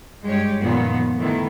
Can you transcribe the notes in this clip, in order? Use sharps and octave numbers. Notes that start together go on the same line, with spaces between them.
G2 G#3 G4 C#5
F#2 A#2 D#3 F3 B3 F4
G#2 D3 D#3 A3 B3 E4